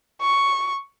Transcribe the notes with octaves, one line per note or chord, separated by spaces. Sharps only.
C#6